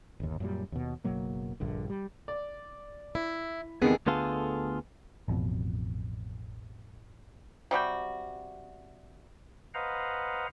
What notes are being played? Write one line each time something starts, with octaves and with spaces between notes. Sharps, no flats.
G1 D#2
F#2 A#2 G3
D#2 B2
F#1 B2 F#3 A#3
A#1 G2 D3
G3
D5
E4
E2 C3 D#3 B3 G#4 A4
D2 D3 B3 F4 G#4 A4
A1 F2 B2
C3 G3 F#4 G5
B4 C5 D#5 F5 F#5 A#5